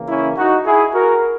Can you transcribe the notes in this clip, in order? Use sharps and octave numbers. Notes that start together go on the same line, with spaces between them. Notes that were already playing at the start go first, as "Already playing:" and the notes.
Already playing: C#3 E3 A#3
C#4 E4
D#4 F#4
E4 G#4
F#4 A#4